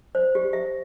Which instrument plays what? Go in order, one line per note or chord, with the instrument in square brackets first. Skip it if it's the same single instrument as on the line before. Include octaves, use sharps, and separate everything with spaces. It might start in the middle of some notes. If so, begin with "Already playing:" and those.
[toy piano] C5
G4
E5